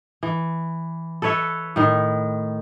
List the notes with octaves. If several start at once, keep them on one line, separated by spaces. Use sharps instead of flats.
E3
A4 B4 C#5 E5
A2 D#3